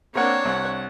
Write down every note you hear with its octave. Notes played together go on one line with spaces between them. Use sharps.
A#3 C4 D4 A#4 C#5 F#5
C2 F#5